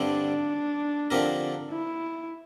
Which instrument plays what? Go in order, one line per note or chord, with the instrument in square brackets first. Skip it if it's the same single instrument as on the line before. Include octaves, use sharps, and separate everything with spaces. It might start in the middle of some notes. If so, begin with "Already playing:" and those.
Already playing: [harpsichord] G2 D3 G3 C4 [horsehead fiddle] D4
[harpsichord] D3 F3 C4 G4 A#4
[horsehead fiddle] E4